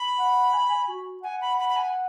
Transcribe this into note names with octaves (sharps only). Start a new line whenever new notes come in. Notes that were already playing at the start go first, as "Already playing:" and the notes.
Already playing: B5
F#5
G#5
G#5
F#4
F#5 G#5
B5
B5
B5
G#5